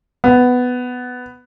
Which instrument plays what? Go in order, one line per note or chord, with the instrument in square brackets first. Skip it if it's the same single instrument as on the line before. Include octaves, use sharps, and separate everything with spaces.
[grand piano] B3